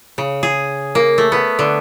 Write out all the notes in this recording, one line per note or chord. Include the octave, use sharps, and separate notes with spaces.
C#3
G#4
A#3
A3
B3
D3